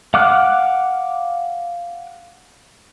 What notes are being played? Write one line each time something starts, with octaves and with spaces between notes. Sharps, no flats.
F5 F#5 D6 F6 F#6